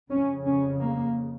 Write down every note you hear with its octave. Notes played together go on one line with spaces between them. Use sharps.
F2 C#3 C#4
C#4
A#3